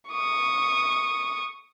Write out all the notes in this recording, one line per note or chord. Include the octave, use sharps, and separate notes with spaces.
C#6 D#6